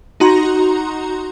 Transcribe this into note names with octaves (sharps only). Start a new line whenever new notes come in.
D#4 F#4 A#5 C6